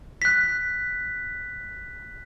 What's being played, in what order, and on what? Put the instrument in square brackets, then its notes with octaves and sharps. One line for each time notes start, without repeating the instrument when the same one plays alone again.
[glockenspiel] F#6 B6